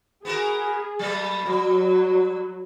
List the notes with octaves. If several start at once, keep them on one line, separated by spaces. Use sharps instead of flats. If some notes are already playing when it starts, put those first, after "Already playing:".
B3 F#4 G#4 A#4
F#3 A3 B3
F#3 G3